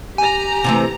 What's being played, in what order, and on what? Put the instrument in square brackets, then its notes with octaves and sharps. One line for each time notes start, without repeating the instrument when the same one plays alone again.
[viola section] G4 A#5 [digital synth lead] G#5
[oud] C3 E3 A3